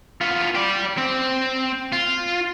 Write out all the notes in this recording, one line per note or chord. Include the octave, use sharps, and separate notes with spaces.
B3 F4
G4 D5
C4
F4